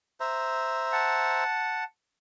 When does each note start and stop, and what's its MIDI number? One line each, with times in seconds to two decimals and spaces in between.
0.20 1.44 72
0.20 1.44 76
0.20 1.44 82
0.93 1.84 78
0.93 1.84 81